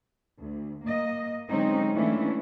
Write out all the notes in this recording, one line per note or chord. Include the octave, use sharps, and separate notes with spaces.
D2
A#3 D#5
D3 F#3 G#3 C4 C#4 D#4
E3 A3 A#3 C#4 D4 E4